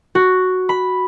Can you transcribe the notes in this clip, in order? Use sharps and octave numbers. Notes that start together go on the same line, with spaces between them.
F#4
B5